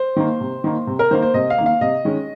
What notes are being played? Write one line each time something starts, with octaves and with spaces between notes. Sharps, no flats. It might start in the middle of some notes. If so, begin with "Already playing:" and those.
Already playing: C5
D#3 A#3
C3
D#3 A#3
C3
A#4
D#3 A#3 C5
C5
C3 D#5
F5
D#3 A#3
F5
C3 D#5
D#3 G#3 C#4